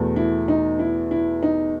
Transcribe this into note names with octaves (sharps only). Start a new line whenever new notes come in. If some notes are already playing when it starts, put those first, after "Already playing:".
Already playing: E2 B2 A3
E4
D#4
E4
E4
D#4